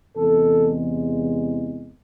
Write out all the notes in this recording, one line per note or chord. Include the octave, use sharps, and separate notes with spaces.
E2 C3 E3 G#3 A4